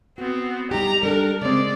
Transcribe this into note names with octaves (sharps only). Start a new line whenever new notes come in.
B3 C4 F#4
G3 D#4 G4 A#5
G3 D4 A4 A#4
C#3 G#3 C4 D5